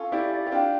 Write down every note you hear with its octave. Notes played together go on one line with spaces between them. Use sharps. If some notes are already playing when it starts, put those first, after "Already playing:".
Already playing: C#4 F4 A4
E4 G4 D5
D5
G4
D4 F4 G5